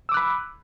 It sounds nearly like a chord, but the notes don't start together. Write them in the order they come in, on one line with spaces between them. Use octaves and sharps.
E6 D6 F#6 B5